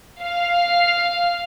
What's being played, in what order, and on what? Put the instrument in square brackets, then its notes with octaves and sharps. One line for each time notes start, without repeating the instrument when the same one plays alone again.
[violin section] F5